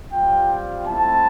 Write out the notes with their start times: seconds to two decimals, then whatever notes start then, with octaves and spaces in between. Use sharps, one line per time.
0.12 G3 C4 F4 G5
0.87 A3 C4 E4 A5